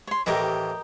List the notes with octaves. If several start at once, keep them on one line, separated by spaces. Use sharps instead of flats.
C#5 C6
D#2 A2 E3 G4 A#4 D#5